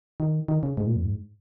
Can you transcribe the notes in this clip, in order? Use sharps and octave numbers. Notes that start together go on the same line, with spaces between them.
D#3
D#3
C#3
G#2
A#2
F2
G#2